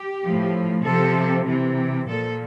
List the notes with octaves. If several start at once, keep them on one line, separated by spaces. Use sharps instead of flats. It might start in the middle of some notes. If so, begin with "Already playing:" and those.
Already playing: G4
A2 F3
C3 F3 A4
C3 E3
A#2 F3 A4